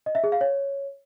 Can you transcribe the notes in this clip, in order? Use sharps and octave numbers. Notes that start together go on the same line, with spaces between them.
D#5
E5
G#4
F5
C#5